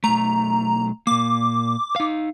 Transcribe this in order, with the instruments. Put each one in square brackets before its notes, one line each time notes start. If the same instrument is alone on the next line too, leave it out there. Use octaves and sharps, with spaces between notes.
[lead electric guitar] B1 A3 [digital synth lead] A#5
[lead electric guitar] A#2 A#3 [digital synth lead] D6
[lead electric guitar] D#4 F5